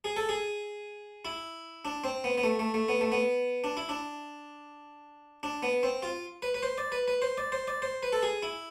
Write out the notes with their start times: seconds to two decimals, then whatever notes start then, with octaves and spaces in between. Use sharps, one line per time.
0.04 G#4
0.16 A4
0.29 G#4
1.25 E4
1.85 D4
2.04 C4
2.24 B3
2.38 B3
2.44 A3
2.59 A3
2.74 A3
2.88 B3
3.01 A3
3.12 B3
3.64 D4
3.77 E4
3.89 D4
5.43 D4
5.63 B3
5.83 C4
6.03 F4
6.42 B4
6.54 B4
6.63 C5
6.78 D5
6.92 B4
7.08 B4
7.22 C5
7.37 D5
7.52 C5
7.68 D5
7.82 C5
8.03 B4
8.12 A4
8.23 G#4
8.43 E4